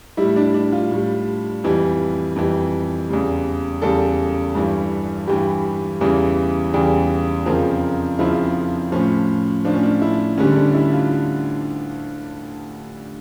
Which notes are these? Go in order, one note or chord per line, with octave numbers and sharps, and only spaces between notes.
A2 G3 E4
D4
D4
F4
A2 G3
F2 E3 G3
F2 E3 G3
E2 C#3 G3
E2 C#3 G3 A4
G2 E3 G3
G2 E3 G3 G4
E2 C#3 E3 G3
E2 C#3 E3 G3 G4
F2 C#3 F3 A#4
F2 C#3 F3 E4
A2 F3 C#4
A2 F3 C#4 D4
D4
E4
D2 D3 G3 C#4
D4
E4
F4